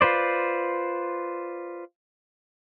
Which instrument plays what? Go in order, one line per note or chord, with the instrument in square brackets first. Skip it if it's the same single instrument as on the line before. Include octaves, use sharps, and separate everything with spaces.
[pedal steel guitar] F4 B4 C5 D5